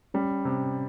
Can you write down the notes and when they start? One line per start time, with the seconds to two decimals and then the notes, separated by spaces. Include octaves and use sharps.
0.14 G3 C#4
0.45 C3